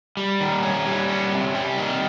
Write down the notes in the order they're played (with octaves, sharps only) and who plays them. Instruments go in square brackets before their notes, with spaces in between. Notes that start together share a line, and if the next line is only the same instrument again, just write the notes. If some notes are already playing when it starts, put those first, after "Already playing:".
[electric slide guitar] G3
D#3
C#4
G3
C#4
C3
G3
D#3